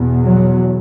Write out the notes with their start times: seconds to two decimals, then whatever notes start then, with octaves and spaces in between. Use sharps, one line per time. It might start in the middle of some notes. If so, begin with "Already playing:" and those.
Already playing: E2 B2
0.24 F#3